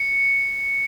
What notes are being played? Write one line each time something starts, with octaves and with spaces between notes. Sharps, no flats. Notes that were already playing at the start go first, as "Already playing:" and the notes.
Already playing: C#7